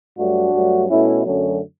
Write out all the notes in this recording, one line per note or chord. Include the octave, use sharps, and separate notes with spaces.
G2 F#3 A3 D4 F#4
G2 F#3 A3
B2 A3 C#4 E4
F#2 D3 F#3 A3 C#4